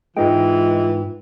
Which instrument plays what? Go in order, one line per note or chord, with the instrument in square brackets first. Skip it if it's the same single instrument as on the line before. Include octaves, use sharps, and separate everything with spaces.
[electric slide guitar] G#2 D#4 G5 [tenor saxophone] E3 [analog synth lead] G#3 [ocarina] F4